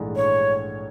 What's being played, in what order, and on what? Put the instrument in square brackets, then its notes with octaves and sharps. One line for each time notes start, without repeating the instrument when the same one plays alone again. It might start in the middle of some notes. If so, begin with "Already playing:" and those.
Already playing: [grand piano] A#1 G#2 E3 A3 D4
[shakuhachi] C#5